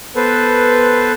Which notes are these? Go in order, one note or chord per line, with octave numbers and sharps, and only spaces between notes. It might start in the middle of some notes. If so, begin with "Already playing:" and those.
B3 A4 B4 C5